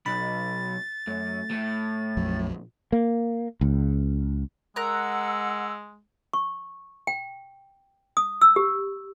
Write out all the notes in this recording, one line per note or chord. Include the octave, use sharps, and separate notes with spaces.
B1 B5 A6
F#2 A3
A2
A#1 F2 F#3
A#3
C#2
G#3 A#4 F#5 A#5 E6 F#6
C#6
G5
D#6
E6
G4